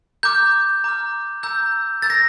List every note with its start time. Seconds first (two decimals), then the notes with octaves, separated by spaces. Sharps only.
0.23 A#5 D6 F6 G6
0.84 A#5 D6 F6
1.43 A#5 E6 G6
2.02 A#5 E6 G6 A6
2.10 A#6